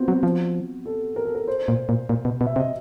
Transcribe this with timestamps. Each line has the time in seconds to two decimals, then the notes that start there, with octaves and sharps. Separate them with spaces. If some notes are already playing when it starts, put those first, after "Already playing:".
Already playing: B3 C4 F4 F#4
0.08 F#3
0.23 F3
0.86 A4
1.16 A#4
1.25 A4
1.35 A#4
1.47 C5
1.68 A#2
1.89 A#2
2.09 A#2
2.25 B2
2.41 B2
2.46 E5
2.56 C3
2.59 D#5